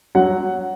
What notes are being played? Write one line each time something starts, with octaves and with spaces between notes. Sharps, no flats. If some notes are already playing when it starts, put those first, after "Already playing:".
F#3 F#5